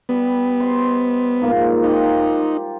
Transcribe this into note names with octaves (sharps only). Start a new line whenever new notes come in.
G3 B3
C5 D#5 C6
G#2 F3 A#3
D#4 F4 G4